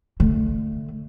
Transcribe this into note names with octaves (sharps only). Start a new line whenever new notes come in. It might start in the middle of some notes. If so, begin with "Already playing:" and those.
D3 A3